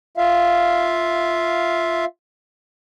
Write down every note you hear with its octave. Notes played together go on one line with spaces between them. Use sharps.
F4 E5 F5